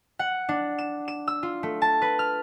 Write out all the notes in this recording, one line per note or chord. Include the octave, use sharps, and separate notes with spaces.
F#5
D4
E7
E7
E6
F4
A3
A5
B4
F6